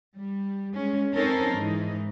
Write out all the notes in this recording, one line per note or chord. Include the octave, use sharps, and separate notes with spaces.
G3
G#3 C#4
C4 C#4 D#4 A4 A#4 C5
G#2 E3 D#4